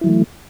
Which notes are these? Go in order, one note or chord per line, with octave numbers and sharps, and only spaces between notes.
E3 F#3 A3 E4